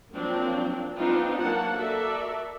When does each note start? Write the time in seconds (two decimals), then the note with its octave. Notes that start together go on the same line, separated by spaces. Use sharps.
0.13 F3 F#3 A#3 C4 D4
0.96 B3 C4 D4 D#4 F4 B4
1.39 F#3 A#3 F#5 A5
1.77 F#4 A4 A#4 D5 E5